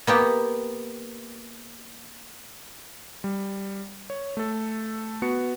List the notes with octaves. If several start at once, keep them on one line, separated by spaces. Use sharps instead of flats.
A#3 B3 G4
G3
C#5
A3 A4
B3 F#4 C#6 C#7